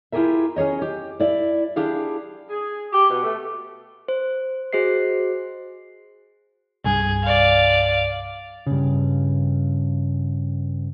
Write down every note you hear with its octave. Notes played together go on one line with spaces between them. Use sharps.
E4 F4 G4 G#4 A#4 E5
C#4 G#4 C#5 D#5
G4
E4 D5 E5
D4 E4 G4 G#4 F5
G#4
G4
B2
A3
C5
F#4 G#4 C5 D#5 C7
C2 G2 G#4
D5 F5
G2 C#3